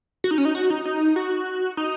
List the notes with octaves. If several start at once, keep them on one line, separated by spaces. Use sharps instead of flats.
F#4
D#4
C#4
D#4
F#4
D#4
D#4
F#4
D#4